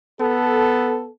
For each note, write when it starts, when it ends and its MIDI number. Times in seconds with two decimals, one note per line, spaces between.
0.21 1.09 59
0.21 1.09 69